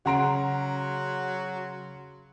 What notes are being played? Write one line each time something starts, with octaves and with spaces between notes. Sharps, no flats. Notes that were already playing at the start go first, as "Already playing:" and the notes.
C#3 F#3 F#5 A#5 C6 D7